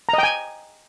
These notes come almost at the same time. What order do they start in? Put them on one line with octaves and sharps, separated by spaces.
A#5 D#5 G5 G#5